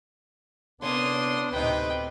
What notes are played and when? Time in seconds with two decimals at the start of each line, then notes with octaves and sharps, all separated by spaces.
0.82 A2 C3 A#3 B3 C#4 D4 C6 D#6
1.52 D2 A2 C3 C4 D#4 B4 G5